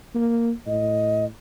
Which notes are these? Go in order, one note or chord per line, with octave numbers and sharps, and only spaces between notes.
A#3
A2 D#5